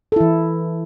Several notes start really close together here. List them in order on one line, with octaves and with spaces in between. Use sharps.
A4 E4 E3